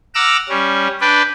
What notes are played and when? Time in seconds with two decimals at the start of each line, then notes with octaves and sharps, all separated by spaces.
0.15 F#5 A#5 D6 E6 F6
0.49 G3 C#4
1.01 D4 B4 D5 G5